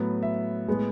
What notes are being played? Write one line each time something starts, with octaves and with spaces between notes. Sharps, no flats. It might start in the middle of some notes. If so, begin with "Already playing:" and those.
Already playing: A2 F#3 B3
E5
A2 G#3 B3